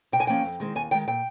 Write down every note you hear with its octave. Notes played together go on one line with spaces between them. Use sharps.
C3 G5
G#5
F3 A#3 C#4 G5
F2
D#3 G#3 C4
D#2 G#5
D#3 G#3 G5
A#2 G5